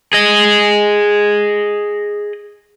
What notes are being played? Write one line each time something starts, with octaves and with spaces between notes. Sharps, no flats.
G#4 D#5